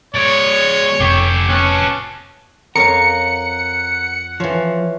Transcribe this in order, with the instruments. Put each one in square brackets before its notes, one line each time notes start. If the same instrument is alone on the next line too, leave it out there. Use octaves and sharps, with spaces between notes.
[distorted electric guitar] G#3 D5 [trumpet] C#5 [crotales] G#6 A6
[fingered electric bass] F1 C3 [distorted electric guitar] G4 A4 [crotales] D6 C7 C#7
[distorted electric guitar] B3 A5 [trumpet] C#4 [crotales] F#6
[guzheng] F2 C#5 F5 [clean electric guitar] A#4 [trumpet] F#5 [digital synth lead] C#7
[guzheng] E3 C#5 [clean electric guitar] F3